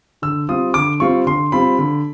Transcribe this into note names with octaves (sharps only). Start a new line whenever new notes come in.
D3 E6
G3 C4 F4 D#6
D3 D6
G3 C4 F4 C#6
D3 C6
G3 C4 F4 B5
D3